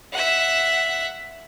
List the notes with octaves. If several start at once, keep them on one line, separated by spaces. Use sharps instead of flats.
E5 F#5